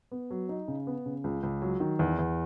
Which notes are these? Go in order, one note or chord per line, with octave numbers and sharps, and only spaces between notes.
B3
F#3
D#4
C#3
B3
C#3
C#2
C#2
F#3
D#3
E2
E2